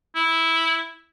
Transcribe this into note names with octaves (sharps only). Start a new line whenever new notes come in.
E4